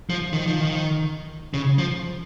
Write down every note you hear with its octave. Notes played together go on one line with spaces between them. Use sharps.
F3
D#3
F3
D#3
C#3
F3